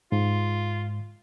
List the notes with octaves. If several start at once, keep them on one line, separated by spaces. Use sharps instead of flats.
G#2 F4